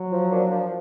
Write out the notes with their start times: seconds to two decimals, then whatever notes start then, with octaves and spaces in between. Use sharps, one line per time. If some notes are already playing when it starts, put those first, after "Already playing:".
Already playing: F#3
0.12 F3
0.32 A#3 D4
0.51 F3